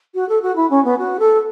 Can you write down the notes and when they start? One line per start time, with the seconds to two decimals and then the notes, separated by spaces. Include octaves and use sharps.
0.15 F#4
0.29 A4
0.42 F#4
0.56 E4
0.70 C#4
0.85 B3
0.98 F#4
1.20 A4